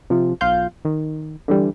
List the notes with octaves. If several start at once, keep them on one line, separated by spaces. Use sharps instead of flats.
C3 F3
B1 F4 F5 G6
D#3
D3 E3 G3